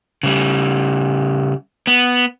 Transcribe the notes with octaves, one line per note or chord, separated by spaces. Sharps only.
C#3 G3
B3